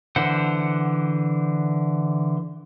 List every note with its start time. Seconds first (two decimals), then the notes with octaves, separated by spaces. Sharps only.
0.16 D3 E3 C5 F#5